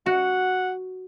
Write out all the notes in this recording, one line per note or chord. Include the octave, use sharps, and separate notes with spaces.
F#4 F#5